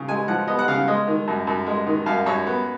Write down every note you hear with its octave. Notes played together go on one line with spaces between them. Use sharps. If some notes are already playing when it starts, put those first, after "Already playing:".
Already playing: C#3
G#3 G#5
F3 F#5
B3 D#5
F#5
C#3 F5
G#3 D#5
D#3
F#2
F#2
G#3
D#3
F#2 F5
F#2 C#5
B3